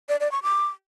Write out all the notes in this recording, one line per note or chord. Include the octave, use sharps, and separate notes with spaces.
D5
D5
C#6
D6